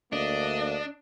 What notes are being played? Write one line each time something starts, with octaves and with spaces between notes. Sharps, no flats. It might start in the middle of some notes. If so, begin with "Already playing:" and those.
D2 A#3 D4 D#5